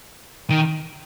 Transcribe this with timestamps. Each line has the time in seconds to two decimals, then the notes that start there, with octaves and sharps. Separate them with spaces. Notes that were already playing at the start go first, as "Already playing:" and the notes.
0.50 D#3